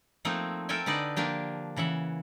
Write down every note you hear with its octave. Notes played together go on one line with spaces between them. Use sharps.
F3 A3 A#3 C4 D#4
A4 A#4 E5 G5 G#5
D3 D#4 B4 D5 D#5
F3 A#3 D4 G4
C#3 E3 E5 F#5